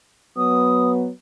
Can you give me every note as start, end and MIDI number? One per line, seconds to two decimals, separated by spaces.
0.37 1.09 54
0.37 1.09 59
0.37 0.91 87